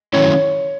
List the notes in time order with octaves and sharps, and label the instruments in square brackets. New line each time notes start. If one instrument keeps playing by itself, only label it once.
[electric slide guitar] D#3 F#3 A3 C#4 E4 [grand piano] C#5